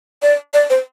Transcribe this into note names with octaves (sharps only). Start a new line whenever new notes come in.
D5
D5
C5